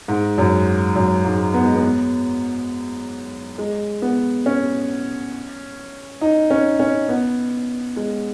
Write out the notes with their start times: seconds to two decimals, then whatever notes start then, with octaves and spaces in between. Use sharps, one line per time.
0.08 G#2
0.38 F#2
0.96 F#2
1.25 G#2
1.54 B3
1.64 G#3
1.75 B3
3.58 G#3
4.02 B3
4.46 C#4
6.21 D#4
6.50 C#4
6.80 C#4
7.09 B3
7.96 G#3